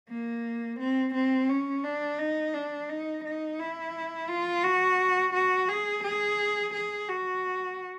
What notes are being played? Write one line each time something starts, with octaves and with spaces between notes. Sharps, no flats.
A#3
C4
C4
C#4
D4
D#4
D4
D#4
D#4
E4
F4
F#4
F#4
G#4
G#4
G#4
F#4